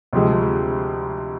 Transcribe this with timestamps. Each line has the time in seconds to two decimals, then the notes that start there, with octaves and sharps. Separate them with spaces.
0.13 D2 C3 F3 G#3